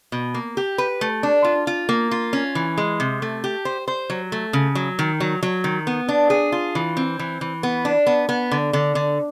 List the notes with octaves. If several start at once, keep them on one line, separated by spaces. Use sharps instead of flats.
B2
A#3
G4
B4
A3
D4
F4
F4
A#3
F4
C#4
E3
G#3
C3
A3
G4
C5
C5
F#3
A3
C#3
F#3
D#3
F#3
F#3
D#3
B3
D4
G#4
F4
E3
C4
E3
E3
B3
D4
B3
B3
D3
D3
D3